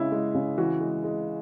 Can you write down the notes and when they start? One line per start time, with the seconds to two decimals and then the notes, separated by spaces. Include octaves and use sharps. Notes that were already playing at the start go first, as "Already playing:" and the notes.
Already playing: C#3 G#3 E4
0.12 G#3
0.35 C#3
0.58 E3 F#4
0.80 G#3
1.04 G#3